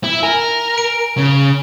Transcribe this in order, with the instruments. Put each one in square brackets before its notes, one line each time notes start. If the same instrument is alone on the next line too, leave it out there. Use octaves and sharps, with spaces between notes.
[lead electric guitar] E4
[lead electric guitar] A#4 [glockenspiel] G#5
[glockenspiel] D7
[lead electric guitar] C#3